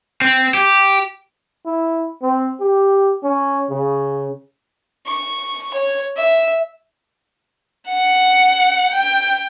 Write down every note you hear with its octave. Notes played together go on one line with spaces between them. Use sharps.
C4
G4
E4
C4
G4
C#4
C#3
C#6
C#5
E5
F#5
G5